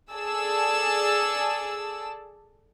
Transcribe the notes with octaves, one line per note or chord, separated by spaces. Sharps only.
G#4 A4 D5 A5 E6